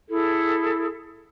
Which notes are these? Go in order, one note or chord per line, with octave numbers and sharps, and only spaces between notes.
E4 G#4 A4